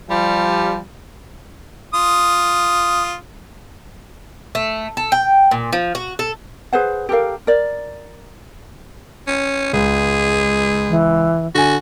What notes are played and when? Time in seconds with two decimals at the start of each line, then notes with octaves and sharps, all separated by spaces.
0.09 F3 G3
1.94 F4 D#6
4.55 A3
4.97 A4
5.12 G5
5.51 A#2
5.73 F3
5.95 F#4
6.19 A4
6.73 G#4 B4 C5 F#5
7.09 G4 A4 A#4 F5
7.47 A#4 D5
9.27 C#4
9.73 C#2 G#3
10.90 E3
11.55 D3 F#4 G#5